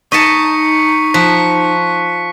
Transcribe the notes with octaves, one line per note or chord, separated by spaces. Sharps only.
D#4 D#5 A5 C#6 B6 C#7
F3 F#6 B6